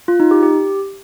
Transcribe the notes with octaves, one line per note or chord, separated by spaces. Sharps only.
F4
D#4
G4
G4